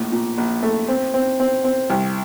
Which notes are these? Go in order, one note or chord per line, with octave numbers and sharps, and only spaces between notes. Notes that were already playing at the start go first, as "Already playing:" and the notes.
Already playing: A#1 A2
A#2
A#1
A3
C4
C4
C4
C4
C2